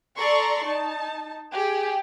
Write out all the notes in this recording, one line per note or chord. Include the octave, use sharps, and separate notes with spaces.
A4 D5 A#5 C6 C#6
D#4 A5
G4 G#4